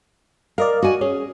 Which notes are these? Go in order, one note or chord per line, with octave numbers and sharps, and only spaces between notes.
A#4 D5 D#5 F5
F#4 G#5
C#4 G#4